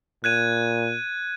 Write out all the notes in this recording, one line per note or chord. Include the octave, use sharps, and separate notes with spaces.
A#2 F#6 G#6 D#7